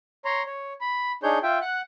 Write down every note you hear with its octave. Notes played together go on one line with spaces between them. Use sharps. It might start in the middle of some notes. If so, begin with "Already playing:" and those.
C#5 A#5 C6
C#5
B5
D4 D#4 G#4 C#5 G6
F4 E5 G5
F#5 F#6